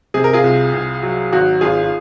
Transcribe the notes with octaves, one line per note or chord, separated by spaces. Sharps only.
C3 G#4
A#4
F4 G#4
C2
C2
F#3
G#1 F#4
G#1 F4 G#4
F4